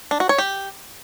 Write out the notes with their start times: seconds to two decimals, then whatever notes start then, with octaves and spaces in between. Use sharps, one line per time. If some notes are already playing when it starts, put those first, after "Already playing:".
0.11 D4
0.20 F#4
0.29 C#5
0.38 G4